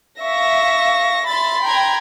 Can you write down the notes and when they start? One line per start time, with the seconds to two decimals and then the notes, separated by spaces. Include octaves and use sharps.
0.21 E5 F5 C#6 A#6
1.27 E5 B5 C6 A6
1.63 G5 A#5 G#6